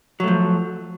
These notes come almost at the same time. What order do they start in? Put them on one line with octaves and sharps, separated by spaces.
F#3 A3 F3